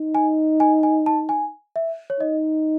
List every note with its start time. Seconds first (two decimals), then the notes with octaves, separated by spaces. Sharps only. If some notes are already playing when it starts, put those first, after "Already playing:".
Already playing: D#4
0.15 G#5
0.60 G#5
0.83 G#5
1.06 A5
1.29 G#5
1.76 E5
2.10 C#5
2.20 D#4 D#5